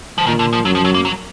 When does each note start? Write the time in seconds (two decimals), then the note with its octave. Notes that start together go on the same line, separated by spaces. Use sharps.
0.18 F3
0.26 A#2 D#3
0.39 D3
0.53 F3
0.65 F#2 F#3
0.75 F3
0.85 F#3
0.94 A#3
1.05 F#3